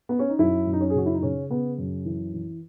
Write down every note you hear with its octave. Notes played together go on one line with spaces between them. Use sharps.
B3
C#4
D#4
F#2 E4
F#2
D#4
C#4
G#4
C#3 F#4
E4
D#4
C#3 C#4
C#3 B3
F#2
E3
E3